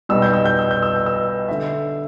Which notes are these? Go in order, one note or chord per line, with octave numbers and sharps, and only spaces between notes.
B1 B2 G3 E6
G6
E6
G6
E6
G6
E6
G6
E6
E5
D3